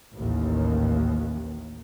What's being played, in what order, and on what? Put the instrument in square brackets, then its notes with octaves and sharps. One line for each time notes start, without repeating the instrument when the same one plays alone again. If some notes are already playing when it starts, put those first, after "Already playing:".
[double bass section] A1 D#2